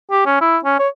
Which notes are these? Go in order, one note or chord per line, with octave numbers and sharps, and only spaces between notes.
G4
C#4
E4
C#4
C#5